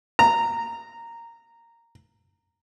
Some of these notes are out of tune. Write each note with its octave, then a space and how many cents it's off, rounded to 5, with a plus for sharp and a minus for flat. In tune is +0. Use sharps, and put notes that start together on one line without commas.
A#5 -10